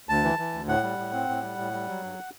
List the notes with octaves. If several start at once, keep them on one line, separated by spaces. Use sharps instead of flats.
D2 A5
E3
E3
D2
A2 F#5
G3
A2
C4
A2
G3
A2
G3
F#3
G2